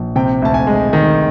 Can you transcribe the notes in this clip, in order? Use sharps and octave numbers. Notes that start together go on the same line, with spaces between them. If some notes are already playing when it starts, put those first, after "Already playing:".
Already playing: A#1
C3 G5
D2 A5
G#5
G#3
D#3